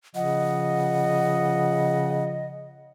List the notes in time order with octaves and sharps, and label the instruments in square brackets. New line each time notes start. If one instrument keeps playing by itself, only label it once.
[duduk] C#3 [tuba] F3 [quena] D#5 [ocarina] F#5